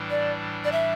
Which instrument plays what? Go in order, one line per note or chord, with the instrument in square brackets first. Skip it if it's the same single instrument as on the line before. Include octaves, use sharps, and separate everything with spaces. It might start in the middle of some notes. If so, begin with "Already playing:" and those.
Already playing: [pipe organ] A2 E3 G3 D4
[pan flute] D5
D5
E5